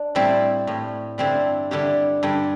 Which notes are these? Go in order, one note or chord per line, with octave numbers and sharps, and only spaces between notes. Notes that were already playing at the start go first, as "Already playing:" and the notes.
Already playing: D4
A2 G3 C4 E4
A2 G3
G2 D3 G3 C4 E4
G2 D3 G3 E4 G4
G2 D3 G3